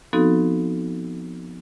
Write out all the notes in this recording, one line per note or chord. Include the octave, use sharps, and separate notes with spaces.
F3 B3 C4 D#4 F#4 A4